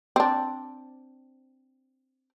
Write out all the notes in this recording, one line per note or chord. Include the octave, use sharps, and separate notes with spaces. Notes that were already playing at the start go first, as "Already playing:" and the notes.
C4 D4